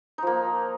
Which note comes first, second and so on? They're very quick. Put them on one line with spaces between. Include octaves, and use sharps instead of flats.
D#4 F3 A#3